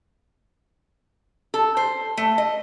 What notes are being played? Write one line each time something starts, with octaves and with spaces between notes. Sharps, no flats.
A4
C5
A3
D#5